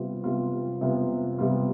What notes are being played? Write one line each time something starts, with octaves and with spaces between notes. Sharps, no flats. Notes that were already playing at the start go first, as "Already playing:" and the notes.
Already playing: C3 G3 B3 F4
C3 G3 B3 F4
C3 G3 B3 F4
C3 G3 B3 F4